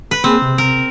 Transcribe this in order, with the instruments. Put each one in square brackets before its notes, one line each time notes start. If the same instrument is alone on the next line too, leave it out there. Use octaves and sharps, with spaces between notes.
[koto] B4
[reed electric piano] A#3 G#4 [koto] C4
[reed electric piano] C3
[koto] A#4